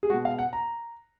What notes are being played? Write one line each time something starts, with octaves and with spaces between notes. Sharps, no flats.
G#4
B2 G#3 F#4
F5
F#5
A#5